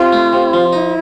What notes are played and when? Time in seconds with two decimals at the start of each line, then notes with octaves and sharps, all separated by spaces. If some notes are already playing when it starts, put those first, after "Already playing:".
Already playing: C3 F4
0.13 A3
0.33 C3
0.53 F3
0.73 D#4 E4